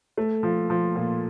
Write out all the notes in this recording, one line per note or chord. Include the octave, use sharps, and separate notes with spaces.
A3
F3
F3
A#2